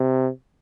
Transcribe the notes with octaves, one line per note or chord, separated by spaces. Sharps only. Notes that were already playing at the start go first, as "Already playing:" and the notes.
Already playing: C3